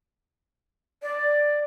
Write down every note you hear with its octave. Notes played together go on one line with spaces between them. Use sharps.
D5